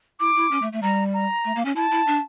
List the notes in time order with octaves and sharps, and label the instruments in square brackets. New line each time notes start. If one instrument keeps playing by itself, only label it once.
[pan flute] E4 [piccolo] D6
[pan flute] E4
C#4
A3
A3
[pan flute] G3 [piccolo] A#5
[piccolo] A#5
[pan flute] A3
A#3
C#4
[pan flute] E4 [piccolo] A5
[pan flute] E4
D4